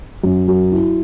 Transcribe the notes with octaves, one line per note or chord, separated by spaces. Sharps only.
F#2
F#3
E4